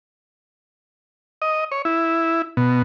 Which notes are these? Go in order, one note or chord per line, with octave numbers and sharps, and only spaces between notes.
D#5
C#5
E4
B2